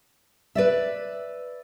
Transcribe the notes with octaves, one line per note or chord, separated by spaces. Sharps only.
B4 D5 E5